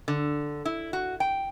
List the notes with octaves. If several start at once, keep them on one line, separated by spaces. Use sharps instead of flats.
D3
E4
F#4
G5